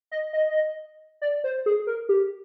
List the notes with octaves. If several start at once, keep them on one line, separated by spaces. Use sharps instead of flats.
D#5
D#5
D5
C5
G#4
A#4
G4